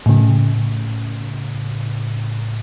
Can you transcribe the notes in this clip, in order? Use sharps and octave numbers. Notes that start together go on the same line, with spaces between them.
A2 C#3